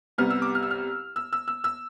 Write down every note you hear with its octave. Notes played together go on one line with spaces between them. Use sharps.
C2 C3 G3 B3 F6
E6
D6
F6
E6
F6
E6
E6
E6
E6